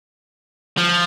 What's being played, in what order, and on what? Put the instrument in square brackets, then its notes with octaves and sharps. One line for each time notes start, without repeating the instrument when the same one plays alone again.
[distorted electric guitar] F3